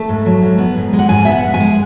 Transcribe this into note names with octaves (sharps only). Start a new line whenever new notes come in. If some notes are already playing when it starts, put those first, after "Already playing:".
Already playing: A3 A5
G#2
F#3
G#2
B3
G#2
G#3
F#5
G#2 G#5
B3 E5
F#5
G#2
G#5
G#3